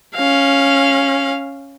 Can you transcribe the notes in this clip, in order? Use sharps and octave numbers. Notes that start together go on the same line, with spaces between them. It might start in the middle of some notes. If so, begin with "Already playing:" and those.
C#4 F5